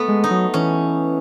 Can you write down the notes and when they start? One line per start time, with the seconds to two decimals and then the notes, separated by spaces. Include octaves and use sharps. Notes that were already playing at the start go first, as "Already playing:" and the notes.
Already playing: A3 B3
0.08 G#3
0.24 D#4
0.31 F#3
0.54 E3 C#4